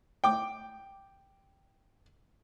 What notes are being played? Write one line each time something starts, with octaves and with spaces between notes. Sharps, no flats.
G5 D6